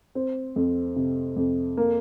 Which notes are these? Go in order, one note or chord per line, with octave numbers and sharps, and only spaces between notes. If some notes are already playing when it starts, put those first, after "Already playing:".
C4
F2
C3
F2
A#3